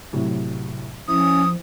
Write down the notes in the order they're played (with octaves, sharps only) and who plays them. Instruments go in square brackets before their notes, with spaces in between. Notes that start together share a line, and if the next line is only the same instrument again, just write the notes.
[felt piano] A2 C3 F#3
[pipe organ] F3 [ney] C#4 [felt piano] E4 [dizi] D#6